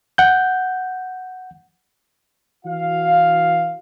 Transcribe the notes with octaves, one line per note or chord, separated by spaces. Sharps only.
F#5 G6
E3 F#4 F5